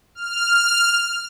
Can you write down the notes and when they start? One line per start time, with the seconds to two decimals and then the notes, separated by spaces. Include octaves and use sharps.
0.15 F6